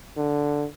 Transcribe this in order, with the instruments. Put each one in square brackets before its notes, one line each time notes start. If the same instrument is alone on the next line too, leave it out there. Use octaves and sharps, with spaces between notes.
[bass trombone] D3